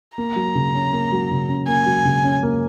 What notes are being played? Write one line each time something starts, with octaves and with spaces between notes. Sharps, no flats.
A#3 A#5
F#3
C#3
C#4
A#3
F#3
C#3
C#4
A#3 G#5
F#3
C#3
C#4
A#3